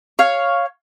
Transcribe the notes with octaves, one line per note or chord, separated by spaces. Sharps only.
C#5 F5